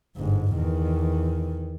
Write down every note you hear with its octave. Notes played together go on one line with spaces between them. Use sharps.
G1 G#2
E2 D#3